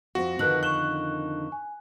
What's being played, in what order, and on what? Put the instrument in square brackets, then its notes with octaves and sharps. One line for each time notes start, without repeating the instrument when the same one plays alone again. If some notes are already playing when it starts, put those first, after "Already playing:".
[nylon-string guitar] F2 C4 [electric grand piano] F#4
[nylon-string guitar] F2 D3 D#3 [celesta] B4 F#6 F#7
[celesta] C#6 E7 G7 [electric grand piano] F#6
[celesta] G#5